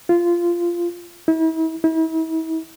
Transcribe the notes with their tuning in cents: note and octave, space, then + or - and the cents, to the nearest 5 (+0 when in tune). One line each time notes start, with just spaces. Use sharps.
F4 -15
E4 -40
E4 -40